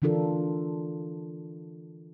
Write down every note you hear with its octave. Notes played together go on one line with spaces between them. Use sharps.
D3 E3 D4 F4 A4 A#4